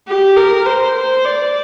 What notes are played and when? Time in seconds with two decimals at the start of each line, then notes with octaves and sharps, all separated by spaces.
0.08 G4
0.37 A#4
0.66 C5
0.96 C5
1.25 D5